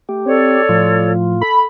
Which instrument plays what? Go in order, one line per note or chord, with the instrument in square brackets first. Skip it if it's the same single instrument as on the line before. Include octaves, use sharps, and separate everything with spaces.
[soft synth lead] A3 [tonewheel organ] G4
[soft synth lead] C4 [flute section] A4 C#5 D5
[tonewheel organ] A2 F4 [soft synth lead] F3
[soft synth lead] A4 [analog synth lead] B5